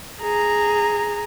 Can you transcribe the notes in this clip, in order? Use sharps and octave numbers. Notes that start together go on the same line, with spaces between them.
G#4 A#5